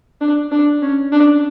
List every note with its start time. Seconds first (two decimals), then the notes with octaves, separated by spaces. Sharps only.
0.21 D4
0.52 D4
0.82 C#4
1.12 D4